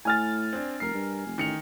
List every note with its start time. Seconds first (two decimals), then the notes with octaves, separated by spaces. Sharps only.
0.05 A2 G#5 F6 A6
0.53 C4 D4
0.80 F1 A#4 C7
0.94 G2
1.26 F1
1.38 A1 D#3 C#7 F7